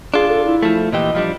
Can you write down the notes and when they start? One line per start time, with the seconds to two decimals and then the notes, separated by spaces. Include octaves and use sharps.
0.14 D4 F4 G#4
0.28 A4
0.45 E4
0.63 F3 A3
0.92 A#2 E3 G4 D#5
1.15 F3 G3 D4